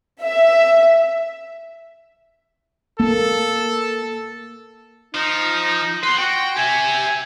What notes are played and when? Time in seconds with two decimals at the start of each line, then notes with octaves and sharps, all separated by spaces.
0.23 E5
3.00 A#3 A4
5.15 F3 D#4
6.04 B4 F#5 C6
6.19 F#4 G5
6.57 G4 E5 G#5